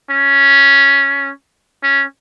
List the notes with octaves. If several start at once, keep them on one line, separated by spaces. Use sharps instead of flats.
C#4
C#4